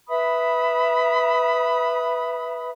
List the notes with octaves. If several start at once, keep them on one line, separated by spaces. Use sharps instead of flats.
B4 E5 B5 D#6